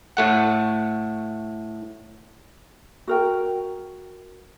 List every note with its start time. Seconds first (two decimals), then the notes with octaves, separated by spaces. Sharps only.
0.17 A2 A3 F#5
3.07 F#4 A#4 G5